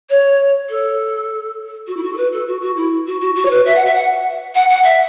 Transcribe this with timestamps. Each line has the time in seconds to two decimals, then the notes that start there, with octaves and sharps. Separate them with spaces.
0.09 C#5
0.68 A4
1.87 F#4
1.96 E4
2.02 F#4
2.12 A4
2.17 B4
2.32 A4
2.47 F#4
2.60 F#4
2.76 E4
3.06 F#4
3.20 F#4
3.35 F#4
3.45 C#5
3.50 B4
3.65 E5
3.75 F#5
3.85 E5
3.94 F#5
4.54 F#5
4.69 F#5
4.83 E5